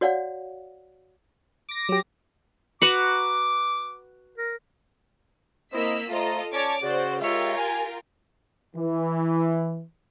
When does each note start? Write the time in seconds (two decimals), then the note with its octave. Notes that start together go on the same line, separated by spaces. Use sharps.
0.01 F#4 C#5 D5 F5 F#5
1.69 D6 A#6
1.89 F#3 G4
2.82 F#4 B4 A#5 D6
4.38 A#4
5.74 A#3 C4 E4 D#5 E6 B6
6.11 A3 F4 A4 C5 D#5 A#5
6.53 C#4 C#5 D5 A5 D6
6.83 C#3 F#4 C5 D5
7.22 G#3 F4 G4 A#4 C#5 E5
7.58 G#5
8.75 E3